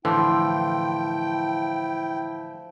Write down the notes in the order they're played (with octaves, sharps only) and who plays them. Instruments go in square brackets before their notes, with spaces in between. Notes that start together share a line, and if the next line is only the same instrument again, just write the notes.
[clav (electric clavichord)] A2 D3 E3 [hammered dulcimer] F3 [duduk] E4 [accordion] G5